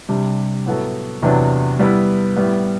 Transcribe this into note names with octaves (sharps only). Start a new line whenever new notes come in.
C3 G3 D4 G4
A2 F#3 B3 F#4 A4
E2 C3 F#3 B3 D4
G3 B3 E4 B4
A2 G3 B3